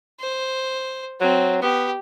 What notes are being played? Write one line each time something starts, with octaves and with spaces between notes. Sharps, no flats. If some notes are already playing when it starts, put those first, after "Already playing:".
C5
F#3 C4
B3 G4